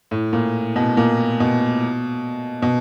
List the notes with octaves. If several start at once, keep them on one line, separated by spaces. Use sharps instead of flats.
A2
A#2
B2
A#2
B2
B2